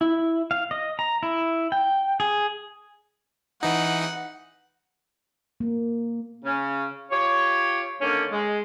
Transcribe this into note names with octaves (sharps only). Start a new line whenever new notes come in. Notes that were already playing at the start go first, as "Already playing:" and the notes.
E4
F5
D#5
A#5
E4
G5
G#4
E3 D#4 F#5
A#3
C#3 C#4
F4 G4 C#5
D3 D#3 A#3 C#4
G#3